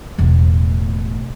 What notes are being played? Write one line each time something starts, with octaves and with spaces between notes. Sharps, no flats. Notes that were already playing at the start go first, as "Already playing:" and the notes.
E1 A2